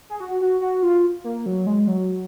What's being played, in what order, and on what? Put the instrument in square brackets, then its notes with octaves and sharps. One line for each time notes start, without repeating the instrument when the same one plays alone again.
[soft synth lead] G#4
F#4
F#4
F#4
F4
A#3
F#3
G#3
F#3